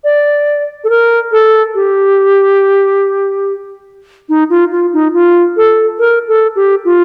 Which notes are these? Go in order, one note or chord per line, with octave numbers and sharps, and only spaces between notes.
D5
A4
A#4
A4
G4
D#4
F4
F4
D#4
F4
A4
A#4
A4
G4
F4